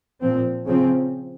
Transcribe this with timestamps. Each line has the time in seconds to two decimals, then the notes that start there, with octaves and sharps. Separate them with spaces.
0.21 A#2 F3 C4
0.67 C#3 F3 C4